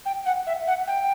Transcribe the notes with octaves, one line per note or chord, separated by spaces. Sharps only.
G5
F#5
E5
F#5
G5